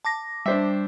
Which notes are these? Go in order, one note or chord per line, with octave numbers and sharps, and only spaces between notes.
A5 D6 A#6
G3 D4 C5 E5